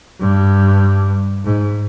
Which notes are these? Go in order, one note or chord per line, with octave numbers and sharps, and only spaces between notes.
G2
G#2